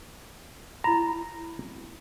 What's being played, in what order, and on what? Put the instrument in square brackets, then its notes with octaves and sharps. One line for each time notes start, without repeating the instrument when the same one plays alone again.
[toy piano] E4 B5 [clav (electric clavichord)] A#5